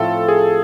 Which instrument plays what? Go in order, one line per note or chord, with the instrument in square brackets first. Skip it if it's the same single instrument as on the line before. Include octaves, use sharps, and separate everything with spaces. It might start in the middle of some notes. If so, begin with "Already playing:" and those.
Already playing: [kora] A2 F3 A3 C4 [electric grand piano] A4
[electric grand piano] G#4